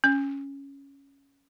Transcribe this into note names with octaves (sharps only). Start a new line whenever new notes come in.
C#4